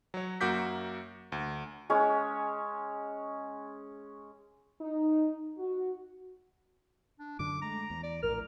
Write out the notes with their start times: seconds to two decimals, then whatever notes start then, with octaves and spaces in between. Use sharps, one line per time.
0.14 F#3 C#5
0.41 F#2 A#3 F#4 D6 G6 B6
1.32 D2
1.90 G#3 C#4 C#5
4.81 D#4
5.58 F#4
7.19 D4
7.39 F#2 D3 D4 D6
7.62 G#3 A3 A#5
7.90 E2
8.03 D5
8.23 A#1 A2 A#4 F6